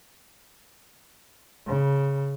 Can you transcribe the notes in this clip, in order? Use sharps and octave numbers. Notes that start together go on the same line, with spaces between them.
C#3